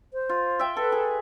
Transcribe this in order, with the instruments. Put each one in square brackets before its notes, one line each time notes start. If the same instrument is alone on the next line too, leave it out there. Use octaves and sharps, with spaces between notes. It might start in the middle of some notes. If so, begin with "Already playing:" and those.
[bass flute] C5
[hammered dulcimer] F4
E5 G5
[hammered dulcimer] A4 [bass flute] B4
[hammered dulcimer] G#4